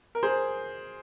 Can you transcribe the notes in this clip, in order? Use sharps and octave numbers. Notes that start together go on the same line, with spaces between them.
A#4
G#4 C5